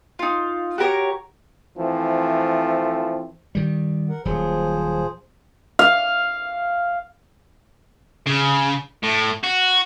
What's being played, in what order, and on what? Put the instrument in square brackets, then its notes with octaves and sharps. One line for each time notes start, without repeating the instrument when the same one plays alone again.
[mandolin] D#4 F4
F#4 G4 A#4 C#5
[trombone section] E3 F3 A3 C4
[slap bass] D#3 G3
[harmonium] A#4 F#5
[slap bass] D#1 F#3 [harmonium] F3 G#4 C5
[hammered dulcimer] F5
[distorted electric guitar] C#3
A2
F#4